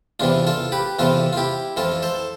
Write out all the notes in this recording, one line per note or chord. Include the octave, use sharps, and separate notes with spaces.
E2 C3 E3 D4 F4
F4 A4
G4 B4
E2 C3 E3 F4 A4
F4
E4 G4
F2 E3 F4 A4
A4 C5